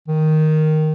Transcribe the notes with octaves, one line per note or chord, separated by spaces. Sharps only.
D#3